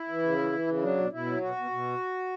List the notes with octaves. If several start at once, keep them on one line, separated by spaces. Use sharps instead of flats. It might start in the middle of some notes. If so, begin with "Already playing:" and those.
Already playing: E4
E3
C#3
E3
E3
C#3
F#3 D4
B2
B2 E4
F#3
B2 F#4
B2
B2